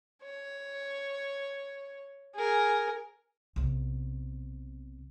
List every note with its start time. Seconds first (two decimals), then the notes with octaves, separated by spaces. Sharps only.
0.23 C#5
2.35 G#4 A#4
3.56 B1 C3